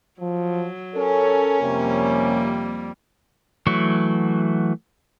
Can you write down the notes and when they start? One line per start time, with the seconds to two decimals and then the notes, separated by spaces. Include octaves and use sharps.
0.21 F3 F#3
0.95 C#4 A4 A#4 C#5
1.62 F2 C3 G3 A#3
3.67 E3 F#3 A3 F#4